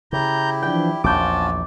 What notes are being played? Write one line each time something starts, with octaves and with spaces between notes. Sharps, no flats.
C#3 E4 G4 A#5 G6
E3 F3 D4 G5
A#1 E2 C#4 F4 F#4 A5 D6 G6